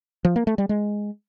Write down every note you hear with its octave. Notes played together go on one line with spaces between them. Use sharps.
F3
A#3
A3
G3
G#3